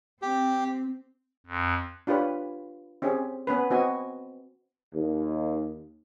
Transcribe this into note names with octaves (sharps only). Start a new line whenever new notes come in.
C4 G4
F2
D4 F4 G4 B4 C#5
C4 C#4 G4 G#4
B3 C#4 B4
B3 C4 F#4 D#5 G#5
D#2